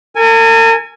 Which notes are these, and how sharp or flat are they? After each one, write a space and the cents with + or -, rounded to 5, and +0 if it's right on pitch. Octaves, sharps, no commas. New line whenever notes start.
A#4 -45 G#5 +0